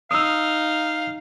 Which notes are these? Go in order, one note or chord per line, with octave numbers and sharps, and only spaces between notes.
D#4 F5 D#6 E6